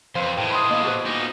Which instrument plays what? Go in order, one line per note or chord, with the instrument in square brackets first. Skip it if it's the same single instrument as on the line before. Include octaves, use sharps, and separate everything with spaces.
[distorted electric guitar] F2 [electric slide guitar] B4 C5 [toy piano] F5 C6
[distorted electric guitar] A2 G#3 [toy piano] G5
[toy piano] B5 C6 D#6
[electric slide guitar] A#3 B3 F5 [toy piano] D#5
[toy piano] E4 G#4 C5 [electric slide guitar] F#4 B4
[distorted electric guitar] A#2 D#4 [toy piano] D6